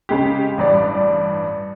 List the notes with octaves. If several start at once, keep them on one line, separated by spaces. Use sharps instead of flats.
C#3 G#3 G4
A1 G2 D5